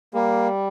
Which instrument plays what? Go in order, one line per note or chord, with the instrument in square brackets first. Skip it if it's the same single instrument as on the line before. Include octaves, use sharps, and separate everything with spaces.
[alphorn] G3 [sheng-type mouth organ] A#3